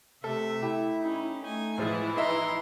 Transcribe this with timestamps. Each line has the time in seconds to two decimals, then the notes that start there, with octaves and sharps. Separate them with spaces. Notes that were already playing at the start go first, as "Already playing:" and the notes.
0.24 C3 A3 A4 E5
0.63 E4 G4
1.00 C#4 D#4
1.43 A3 D#4 G#5
1.78 A2 E3 F3 G#3 E4 G#4
2.16 D#4 B4 D#5 E5 A#5 C6